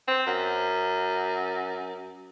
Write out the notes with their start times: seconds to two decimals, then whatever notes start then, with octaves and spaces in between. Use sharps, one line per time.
0.07 C4
0.26 F#2